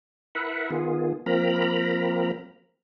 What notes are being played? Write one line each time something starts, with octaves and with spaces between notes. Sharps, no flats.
E4 A#4 B4 E5 F#5
D#3 B3 F4 G#4
F3 A#3 C4 A#4 A#5 B5